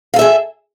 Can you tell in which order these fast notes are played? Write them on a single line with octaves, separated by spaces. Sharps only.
F5 A4 E5 G#4